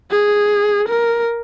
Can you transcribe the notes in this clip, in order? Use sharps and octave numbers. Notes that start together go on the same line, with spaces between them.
G#4
A#4